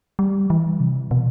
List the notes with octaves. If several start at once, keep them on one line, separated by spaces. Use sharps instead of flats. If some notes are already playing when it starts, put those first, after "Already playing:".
G3
E3
C3
B2